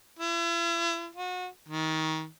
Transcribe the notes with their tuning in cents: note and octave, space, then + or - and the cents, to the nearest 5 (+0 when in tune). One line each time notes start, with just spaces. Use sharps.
E4 +40
F#4 -30
D#3 +25